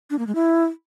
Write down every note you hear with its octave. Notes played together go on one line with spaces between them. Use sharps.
D4
A#3
G#3
E4